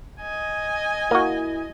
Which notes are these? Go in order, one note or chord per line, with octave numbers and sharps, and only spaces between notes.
D#5 G#5
A#3 E4 F#4